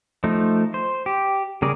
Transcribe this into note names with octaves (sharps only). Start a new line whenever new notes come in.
F3 A3 D#4
C5
G4
C#3 G3 G#4 A#4 D5